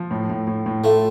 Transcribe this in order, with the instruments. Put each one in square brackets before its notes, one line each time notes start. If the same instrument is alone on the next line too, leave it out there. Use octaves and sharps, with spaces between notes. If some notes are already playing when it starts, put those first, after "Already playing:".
Already playing: [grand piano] F3
A2
A2
A2
A2
[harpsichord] A3 [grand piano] F4